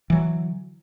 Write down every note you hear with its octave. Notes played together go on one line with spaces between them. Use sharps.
D3 E3 F#3